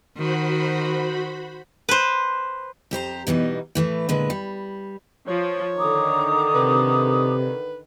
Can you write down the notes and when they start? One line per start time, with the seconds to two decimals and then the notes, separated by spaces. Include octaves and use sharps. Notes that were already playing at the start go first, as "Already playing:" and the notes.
0.17 D#3 F#4 C5 B5
1.89 B4 C5
2.91 F2 G4 C5 A#5
3.27 B2 E3 G3 D#4
3.75 A2 E3 A3
4.09 A#2 D3 G#3 B4
4.30 G3
5.28 F3 C#5
5.77 D3 D#3 A#5 D6 D#6
6.54 C3 B4